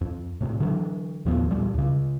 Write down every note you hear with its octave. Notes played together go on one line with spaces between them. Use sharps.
F2
A2 C3
D3 E3 F#3
D#2 A2 F3 B3
E2 A#2 G3
C#2 C#3